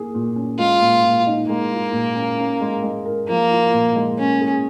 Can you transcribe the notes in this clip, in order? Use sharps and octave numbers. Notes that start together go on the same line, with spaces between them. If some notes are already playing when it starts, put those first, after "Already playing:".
Already playing: A#3 G#4
A#2
C#4
G#3 F4
A#2
A#2
D#4
G#3 A#3
F4
A#2
C#4
C#4
G#3
G#3
A#4
F3 A#3
F4
A#2
G#3
A#3 C#4
G#4